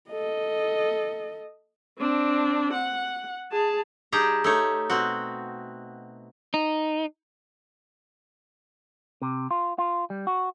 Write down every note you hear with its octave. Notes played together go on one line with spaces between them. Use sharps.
A4 D#5
C4 D4
F#5
G#4 A5
G3 D#4 G4 G#4 A5 A#5
A3 D#4 C#5
B2 C4 F#4
D#4
C3
F4
F4
G3
F#4